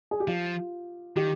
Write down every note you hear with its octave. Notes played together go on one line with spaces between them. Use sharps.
G#4
G4
F3 F4
D#3 G4